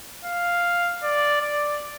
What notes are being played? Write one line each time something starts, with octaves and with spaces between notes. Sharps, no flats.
F5
D5
D5